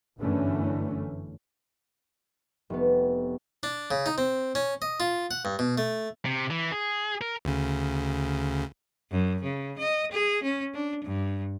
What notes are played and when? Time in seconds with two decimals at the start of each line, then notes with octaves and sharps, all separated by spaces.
0.19 G1 F#2 D3 E3 A3 C#4
2.70 F1 B3
3.63 D4
3.91 C#3
4.06 D#4
4.18 C4
4.55 C#4
4.82 D#5
5.00 F4
5.31 F#5
5.45 G2
5.59 B2
5.78 A3
6.25 C3
6.50 E3
6.72 G#4
7.21 A#4
7.45 D2 C#3
9.11 F#2
9.43 C#3
9.78 D#5
10.11 G#4
10.43 C#4
10.74 D4
11.04 G2